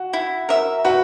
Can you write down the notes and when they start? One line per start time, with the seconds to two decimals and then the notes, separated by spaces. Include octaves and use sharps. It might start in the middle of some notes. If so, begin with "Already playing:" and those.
Already playing: F#4
0.13 E4
0.49 A#4 E5
0.84 F#4 B4